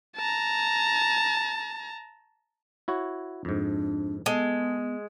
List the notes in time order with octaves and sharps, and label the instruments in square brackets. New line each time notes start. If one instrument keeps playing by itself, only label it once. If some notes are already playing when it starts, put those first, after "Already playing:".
[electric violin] A5 A#5
[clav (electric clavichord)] E4 F#4 C#5
[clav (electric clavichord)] F2 G#2 [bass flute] D4
[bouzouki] G#3 [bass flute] B3 [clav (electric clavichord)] A4